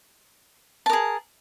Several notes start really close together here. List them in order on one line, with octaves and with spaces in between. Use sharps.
A5 A#4 G#4